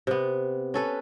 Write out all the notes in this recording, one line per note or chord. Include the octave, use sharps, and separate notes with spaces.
C3 B3
C#4 A4 B4